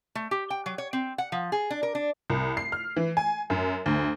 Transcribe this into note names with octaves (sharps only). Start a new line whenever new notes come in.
A3
G4
G5
F#3
C#5
C4
F#5
F3
G#4
D4
A#4
D4
C2
C7
F6
E3
G#5
F#2
D2